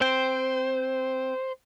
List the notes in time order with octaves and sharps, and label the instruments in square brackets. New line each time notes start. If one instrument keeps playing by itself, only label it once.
[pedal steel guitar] C4 G5 [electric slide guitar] C5